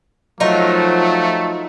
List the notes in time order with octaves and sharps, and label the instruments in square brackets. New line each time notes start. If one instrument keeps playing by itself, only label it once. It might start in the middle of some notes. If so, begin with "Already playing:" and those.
[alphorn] F3 [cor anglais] F#3 [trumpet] A3 [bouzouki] D#4 F4 A#4